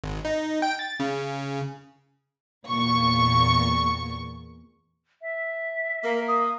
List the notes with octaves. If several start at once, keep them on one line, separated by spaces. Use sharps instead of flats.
G#1
D#4
G5
A6
C#3
E2 A#2 C#6
E5
A#3 A#4
D#6